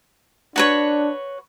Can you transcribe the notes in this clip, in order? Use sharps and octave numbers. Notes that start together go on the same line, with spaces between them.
D4 F#4 B4 C#5